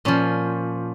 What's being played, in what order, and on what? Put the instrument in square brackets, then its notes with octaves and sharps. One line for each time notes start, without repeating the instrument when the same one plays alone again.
[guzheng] A#2 F3 C#4